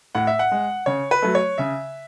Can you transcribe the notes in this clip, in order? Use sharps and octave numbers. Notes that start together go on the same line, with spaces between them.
A2 F#5
E5
F#5
G#3
C#3 C#5
B4
F#3 A3
C#5
C#3 E5